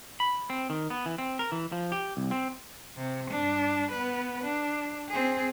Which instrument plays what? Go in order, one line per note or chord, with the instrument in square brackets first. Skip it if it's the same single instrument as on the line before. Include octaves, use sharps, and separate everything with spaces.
[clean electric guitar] B5
C4
D#3
B3
E3
C4
A#4
E3
F3
G4
C2
C4
[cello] C3
G2 D4
B3 B4
D4
C4 G#4